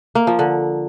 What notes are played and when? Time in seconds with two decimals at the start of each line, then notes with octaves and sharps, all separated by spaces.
0.15 A#3
0.27 F3
0.39 D3